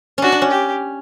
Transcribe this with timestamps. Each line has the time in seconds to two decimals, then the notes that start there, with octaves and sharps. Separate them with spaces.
0.18 C#4 D4 F#4
0.32 D4
0.42 C#4
0.51 G4